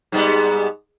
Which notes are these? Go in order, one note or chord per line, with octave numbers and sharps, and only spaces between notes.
G#2 G3 B3